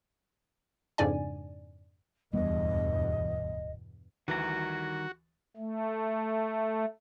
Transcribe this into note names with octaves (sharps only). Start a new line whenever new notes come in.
F2 G#2 C#3 D4 D5 G#5
D1 E2 G2 B2 G3 B3 D#5
D2 D#3 E3 G3 F#4 A#5
A3